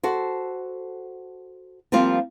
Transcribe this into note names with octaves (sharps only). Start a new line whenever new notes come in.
F#4 A4 C5
F3 G3 A#3 C4 F4